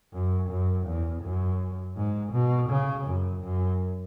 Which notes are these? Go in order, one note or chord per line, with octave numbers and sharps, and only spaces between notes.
F#2
F#2
E2
F#2
G#2
B2
C#3
F#2
F#2